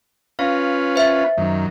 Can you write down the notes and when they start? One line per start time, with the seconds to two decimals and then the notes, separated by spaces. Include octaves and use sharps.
0.39 C#4 F4 B4 F5
0.96 C5 E5
1.37 F#2 D#3